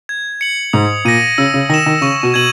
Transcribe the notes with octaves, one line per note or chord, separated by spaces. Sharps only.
G#6
C#7 F#7
G#2 D#6
A#2 A#6 D#7
C#3 E6
C#3
D#3 A#6 E7
D#3
C#3 C#6
B2
B2 G#6 D#7 F#7